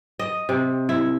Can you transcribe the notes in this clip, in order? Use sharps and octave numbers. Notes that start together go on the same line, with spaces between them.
D#5
C3
E4